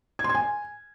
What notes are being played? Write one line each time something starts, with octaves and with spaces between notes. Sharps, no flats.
G#6
C6
G#6
G#5